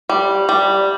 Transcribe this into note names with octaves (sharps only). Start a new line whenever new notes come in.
G3
G3